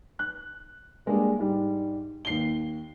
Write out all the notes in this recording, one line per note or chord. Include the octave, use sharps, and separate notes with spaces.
F#6
G3 G#3 A#3 D4 G#4
G#2 G3
D#2 C7 G7